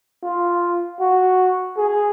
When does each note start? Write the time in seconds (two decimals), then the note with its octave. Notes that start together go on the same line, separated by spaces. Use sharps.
0.24 F4
1.00 F#4
1.77 G#4